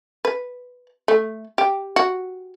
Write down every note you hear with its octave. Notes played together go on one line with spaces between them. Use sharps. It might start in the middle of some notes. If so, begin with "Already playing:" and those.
B4
A3
G4
F#4